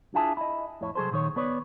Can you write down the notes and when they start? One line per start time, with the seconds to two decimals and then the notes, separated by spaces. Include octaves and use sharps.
0.14 D4 E4 F4 G#4 E5 A5
0.37 E4 D#5
0.81 F2 A2 E4 C#5
0.95 C2 F#3 G#4 A4 C5
1.11 A#2 D#3 C#5
1.36 B3 B4 C#5 D5